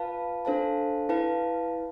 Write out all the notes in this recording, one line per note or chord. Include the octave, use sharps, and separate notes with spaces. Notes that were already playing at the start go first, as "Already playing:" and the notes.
Already playing: F4 B4 F5 A5
D4 A4 C5 F5 A5
E4 B4 F5 A5